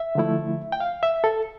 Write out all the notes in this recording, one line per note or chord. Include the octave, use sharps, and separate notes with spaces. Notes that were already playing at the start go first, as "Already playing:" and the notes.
Already playing: E5
D3 F3 A3 E4
G5
F5
E5
A4